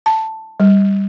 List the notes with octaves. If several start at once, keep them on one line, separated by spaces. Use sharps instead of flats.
A5
G3